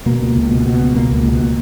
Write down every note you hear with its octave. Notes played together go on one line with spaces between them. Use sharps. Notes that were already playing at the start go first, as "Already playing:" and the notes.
B2 A#3
C#2
C#2
B2
B2
C#2
B2 A#3
C#2
B2
A#3